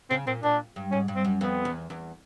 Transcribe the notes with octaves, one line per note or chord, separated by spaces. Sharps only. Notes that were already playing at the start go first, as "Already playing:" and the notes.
C#3 C4
A#2 C4
A#2 D4
G2
G#2 C#4
G2
C4
F#2
F2 B3
E2
E2